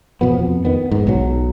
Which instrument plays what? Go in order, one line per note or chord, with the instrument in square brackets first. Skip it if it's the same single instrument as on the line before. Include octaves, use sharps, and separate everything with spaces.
[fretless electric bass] B2 F3 B3
F2
D#3 B3
G#2
B1 F#3